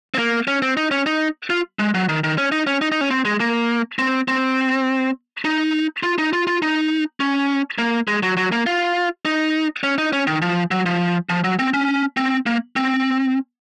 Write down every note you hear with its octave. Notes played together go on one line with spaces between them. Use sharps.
C4
A#3
C#4
C4
D#4
C#4
D#4
F4
G#3
F#3
D#3
D#3
C#4
D#4
C#4
D#4
D#4
C#4
C4
G#3
A#3
C4
C4
D#4
F4
D#4
F4
F4
D#4
C#4
A#3
G#3
F#3
F#3
A#3
F4
D#4
C#4
D#4
C#4
D#3
F3
F#3
F3
F3
F#3
C4
C#4
C4
A#3
C4